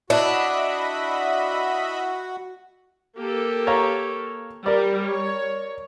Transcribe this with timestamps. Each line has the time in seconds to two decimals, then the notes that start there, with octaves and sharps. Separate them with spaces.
0.10 D4 E4 F#4 D#5 E5 A5 B5 F#6
3.17 A#3 G4 A4
3.67 C#5 F5 A#5
4.66 G3 G4 A#4 D5
5.06 C#5